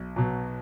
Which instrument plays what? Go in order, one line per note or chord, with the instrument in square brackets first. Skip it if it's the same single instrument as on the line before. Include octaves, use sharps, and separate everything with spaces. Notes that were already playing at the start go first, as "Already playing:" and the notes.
Already playing: [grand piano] B1
B2 F#3